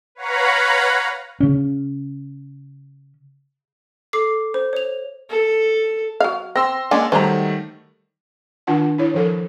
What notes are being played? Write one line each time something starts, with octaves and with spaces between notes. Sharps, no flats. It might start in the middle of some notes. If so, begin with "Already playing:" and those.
B4 C#5 F5 F#5 A#5 B5
C#3 C#4
A4 D6 C7
C5
C#5 F7
A4
F#3 F5
C4 C6 E6 A#6
G#3 A#3 C#4 D4
D#3 F#3 G3 A3 C5 A5 A#5
D#3 D4 F4 F#5 A5
E4 C#5
F3 A4 A#4